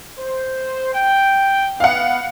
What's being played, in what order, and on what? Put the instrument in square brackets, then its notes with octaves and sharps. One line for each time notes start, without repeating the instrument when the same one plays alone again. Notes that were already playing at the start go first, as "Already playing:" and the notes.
[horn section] C5
G5
[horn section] B3 [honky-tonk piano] F5 F#5